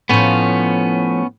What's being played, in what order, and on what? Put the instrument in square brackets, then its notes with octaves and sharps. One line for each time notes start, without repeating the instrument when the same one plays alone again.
[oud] A2 F3 [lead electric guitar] B3 C#4